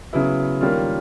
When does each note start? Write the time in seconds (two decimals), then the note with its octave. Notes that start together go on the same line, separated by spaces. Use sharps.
0.13 C#3 F#3 B3 E4
0.61 D#3 G3 A#3 C#4 F4